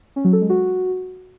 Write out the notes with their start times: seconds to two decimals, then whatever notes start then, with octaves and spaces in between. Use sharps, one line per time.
0.16 C#4
0.24 F#3
0.33 A4
0.41 G#3
0.50 F#4